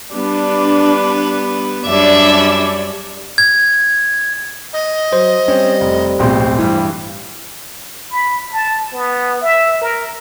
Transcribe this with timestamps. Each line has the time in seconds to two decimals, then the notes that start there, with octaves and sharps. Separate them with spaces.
0.14 G3 B3 D4 B4
1.86 F#2 G3 D4 C#5 D5 E5
3.38 G#6
4.73 D#5
5.13 F#3 C5
5.48 G3 C4 C#4
5.81 F1
6.19 D1 A#1 B2 C4
6.58 G2 E3 G3
8.11 B5
8.51 A5
8.93 B3
9.42 E5
9.81 A#4